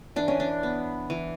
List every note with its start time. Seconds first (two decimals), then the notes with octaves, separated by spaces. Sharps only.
0.16 E3 D4
0.28 C#4
0.40 D4
0.63 B3
1.10 E3